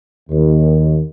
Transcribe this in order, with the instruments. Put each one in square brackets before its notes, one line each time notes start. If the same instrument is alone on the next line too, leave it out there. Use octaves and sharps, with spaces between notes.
[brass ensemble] D#2